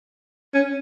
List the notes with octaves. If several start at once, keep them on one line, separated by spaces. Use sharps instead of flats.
C#4